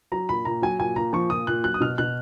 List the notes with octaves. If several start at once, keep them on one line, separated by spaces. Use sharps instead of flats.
F#3 A#5
A#2 B5
A#2 A#5
F#3 G#5
A#2 G#5
A#2 A#5
F3 C#6
A#2 D#6
A#2 F#6
F#3 F#6
D#6
B2 F6
B2 F#6